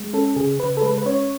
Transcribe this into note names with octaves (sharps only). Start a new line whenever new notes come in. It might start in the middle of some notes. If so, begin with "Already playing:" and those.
Already playing: G#3
C#4 A4
C#3 G#4
C#3 B4
A4
G#3 B4
B4
C#4 C#5